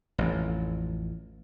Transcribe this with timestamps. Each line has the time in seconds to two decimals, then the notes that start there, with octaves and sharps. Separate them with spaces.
0.18 A1 F2